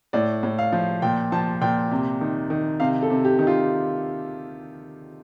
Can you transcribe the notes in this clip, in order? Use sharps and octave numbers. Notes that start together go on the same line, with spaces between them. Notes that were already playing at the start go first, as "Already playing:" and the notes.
A2 D5
A2
F5
F3
A#2 G5
F3 A5
A#2 G5
C3
D#3
D#3
C3 F5
A4
C3
G4
D#3
F4